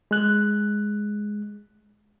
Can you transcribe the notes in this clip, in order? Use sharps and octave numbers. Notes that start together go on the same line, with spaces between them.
G#3 F#6